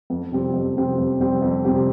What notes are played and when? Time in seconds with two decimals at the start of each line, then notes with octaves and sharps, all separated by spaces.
0.10 F2
0.32 C3 G3 C4 G4
0.54 F2
0.76 C3 G3 C4 G4
0.98 F2
1.20 C3 G3 C4 G4
1.42 F2
1.65 C3 G3 C4 G4